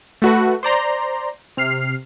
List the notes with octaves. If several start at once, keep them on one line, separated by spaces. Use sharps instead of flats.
A3 F#4 B4
C5 D5 A#5 C6
C3 F6 C7